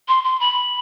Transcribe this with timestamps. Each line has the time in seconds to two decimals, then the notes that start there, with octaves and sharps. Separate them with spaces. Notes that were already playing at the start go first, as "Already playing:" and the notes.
0.08 C6
0.24 C6
0.40 B5